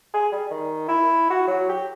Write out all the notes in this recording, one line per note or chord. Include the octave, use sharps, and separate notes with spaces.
G#4
G3
D#3
E4
F#4
F#3
G4